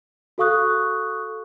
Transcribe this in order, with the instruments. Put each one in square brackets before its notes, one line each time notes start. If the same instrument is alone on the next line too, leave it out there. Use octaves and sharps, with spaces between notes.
[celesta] F#4 A4 F5 C#6 D#6 F#6